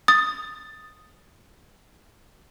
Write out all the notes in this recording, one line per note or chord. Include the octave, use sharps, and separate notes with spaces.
D#6 A6